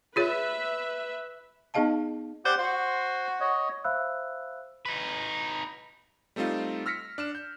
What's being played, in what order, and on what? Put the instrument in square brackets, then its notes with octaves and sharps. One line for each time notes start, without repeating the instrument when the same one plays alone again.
[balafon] F4 G#4 C#5 [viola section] B4 E5
[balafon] B3 D#4 G#4 D#5 F5 A5
[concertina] G4 D5 F#5 [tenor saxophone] C5
[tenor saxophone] F#4 [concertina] C5 C6
[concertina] C#5 D#5
[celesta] C5 E5 F5 B5 E6 F#6
[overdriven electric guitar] D#4 B4
[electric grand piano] G3 A3 C4 D#4 F4
E6 F6 A#6 B6 C#7
D4 F6 E7
G6